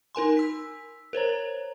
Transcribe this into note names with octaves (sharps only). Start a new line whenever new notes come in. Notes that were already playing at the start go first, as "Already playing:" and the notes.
D#4 A#4 G#5 C6
E6 B6
A#4 C5 C#5 A#5